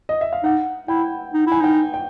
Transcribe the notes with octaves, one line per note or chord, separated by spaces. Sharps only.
D#5
E5
F5
D#4 F#5
E4 G5
D#4
E4 G#5
D#4 G5
G5